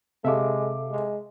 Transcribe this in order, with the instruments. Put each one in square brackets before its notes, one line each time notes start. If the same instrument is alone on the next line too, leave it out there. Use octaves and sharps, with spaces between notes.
[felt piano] C3 F5 D6 [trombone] G#3 [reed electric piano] A4 E5
[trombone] G#3